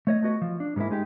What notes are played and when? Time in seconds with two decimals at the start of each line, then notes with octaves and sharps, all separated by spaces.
0.07 A3 C#5 D#5
0.22 A3 B3 F#4 D#5
0.42 F3
0.60 D4
0.76 G#2 G3 G#3 A#3 E4
0.90 G#3 D#4 G4